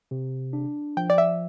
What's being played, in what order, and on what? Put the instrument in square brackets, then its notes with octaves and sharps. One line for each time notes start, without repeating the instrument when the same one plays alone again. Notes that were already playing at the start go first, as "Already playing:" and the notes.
[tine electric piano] C3
D4
[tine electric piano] F3 [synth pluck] G5
[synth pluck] D5
E5